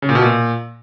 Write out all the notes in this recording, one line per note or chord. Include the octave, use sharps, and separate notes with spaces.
C#3
A#2
B2
A#2